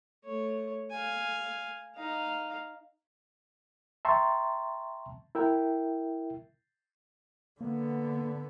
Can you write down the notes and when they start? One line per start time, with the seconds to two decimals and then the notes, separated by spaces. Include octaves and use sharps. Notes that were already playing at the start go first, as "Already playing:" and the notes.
0.25 A3 C#5
0.90 F5 G#5
1.95 D#4 F5
4.05 E5 G5 A5 A#5 C6 C#6
5.35 E4 A#4 E5 G5
7.61 D3 A#3 B3